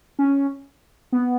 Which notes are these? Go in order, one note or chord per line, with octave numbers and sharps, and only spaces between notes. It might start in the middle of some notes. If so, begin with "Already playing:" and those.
C#4
B3